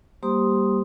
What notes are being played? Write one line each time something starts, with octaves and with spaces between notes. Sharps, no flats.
G3 A#3 G4 C5 C6 D#6